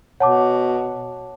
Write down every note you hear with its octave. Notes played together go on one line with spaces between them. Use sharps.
B2 C#5 F#5 A5 D6